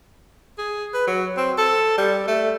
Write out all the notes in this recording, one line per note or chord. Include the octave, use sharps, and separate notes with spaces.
G#4
B4
F#3
C4
A4
G3
A3